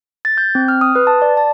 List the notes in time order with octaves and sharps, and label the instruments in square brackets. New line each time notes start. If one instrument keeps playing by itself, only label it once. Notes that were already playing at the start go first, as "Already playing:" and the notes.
[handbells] A6
G6
C4
F6
D#6
B4
A5
D5
A5